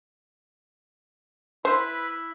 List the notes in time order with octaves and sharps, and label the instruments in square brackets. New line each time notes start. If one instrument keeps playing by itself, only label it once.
[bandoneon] E4 E5 [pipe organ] B4 [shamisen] C5